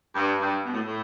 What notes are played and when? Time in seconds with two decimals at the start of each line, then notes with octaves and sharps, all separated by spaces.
0.15 G2
0.40 G2
0.66 B2
0.72 A2
0.87 A2